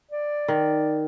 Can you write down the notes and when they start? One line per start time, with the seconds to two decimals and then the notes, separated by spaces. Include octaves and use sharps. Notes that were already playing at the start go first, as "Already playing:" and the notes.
0.11 D5
0.48 D#3